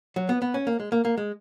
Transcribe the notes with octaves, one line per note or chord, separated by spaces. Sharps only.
F#3
B3
B3
C#4
A#3
G#3
A#3
A#3
G#3